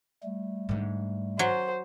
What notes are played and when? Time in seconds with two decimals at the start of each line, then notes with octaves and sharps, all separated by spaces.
0.23 G3 A3
0.69 G#2 D3
1.39 F#3 C5